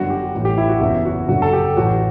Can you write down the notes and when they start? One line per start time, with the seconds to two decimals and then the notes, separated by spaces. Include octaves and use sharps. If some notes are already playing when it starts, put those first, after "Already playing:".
Already playing: G1 F#2 D3 F#4
0.10 G4
0.34 A1 A2 E3
0.45 G4
0.58 E4
0.69 F#4
0.81 F#1 E2 C#3 E3 E4
1.05 F#4
1.28 F#1 F#2 D3 F#4
1.42 A4
1.53 G4
1.76 A1 A2 E3 F#4